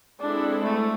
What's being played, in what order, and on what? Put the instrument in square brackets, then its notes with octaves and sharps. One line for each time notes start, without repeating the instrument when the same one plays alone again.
[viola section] G#3 C4 E4 A4 [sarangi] D4
[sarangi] A3